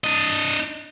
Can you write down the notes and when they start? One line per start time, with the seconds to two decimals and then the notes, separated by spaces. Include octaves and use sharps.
0.04 D4 D#5